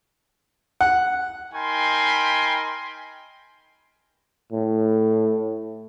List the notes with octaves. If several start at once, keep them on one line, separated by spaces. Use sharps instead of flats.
F#5
D#4 A#4 G5 G#5 B5 C6
A2